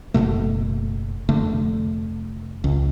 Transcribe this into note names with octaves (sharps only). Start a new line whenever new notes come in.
F#1 D#2 B2 A3
F1 D3 A3
C#2